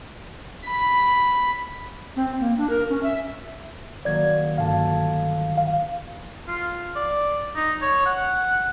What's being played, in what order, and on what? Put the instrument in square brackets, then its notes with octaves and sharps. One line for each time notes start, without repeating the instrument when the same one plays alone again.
[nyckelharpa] B5
[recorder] C4
A#3
D4
A#4
C#4
E5
[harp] D#3 F#3 A#3 [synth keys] D5 G#6
[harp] G1 A5 G#6 [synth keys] F5
[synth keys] F5
[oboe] F4
D5
D#4
C#5
F#5